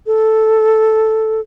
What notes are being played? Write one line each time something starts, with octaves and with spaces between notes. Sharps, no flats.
A4